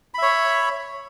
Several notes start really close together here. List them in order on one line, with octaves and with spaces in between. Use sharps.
B5 E5 C#5